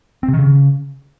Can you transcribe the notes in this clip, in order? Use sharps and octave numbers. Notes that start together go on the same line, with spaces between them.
C4
C3
D#3
C#3